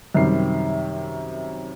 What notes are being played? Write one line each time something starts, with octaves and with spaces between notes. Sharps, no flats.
F#2 C3 D#3 G3 C7